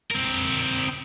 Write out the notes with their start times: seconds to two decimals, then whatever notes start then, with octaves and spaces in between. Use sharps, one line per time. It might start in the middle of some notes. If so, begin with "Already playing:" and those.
0.11 C4 A#4